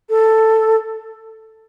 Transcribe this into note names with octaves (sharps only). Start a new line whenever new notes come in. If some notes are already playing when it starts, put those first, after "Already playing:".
A4